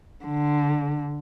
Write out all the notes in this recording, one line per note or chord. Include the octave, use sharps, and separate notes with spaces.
D3